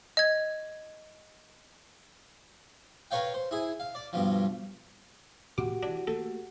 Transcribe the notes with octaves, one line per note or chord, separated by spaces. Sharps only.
D#5 G#6
A#4 B4 C#5 F5 G5
C5
E4 G#4
F5
D5
G2 B2 F3
A2 F#4 G4 F#5 D6
E3 D4
A3 A#3 A4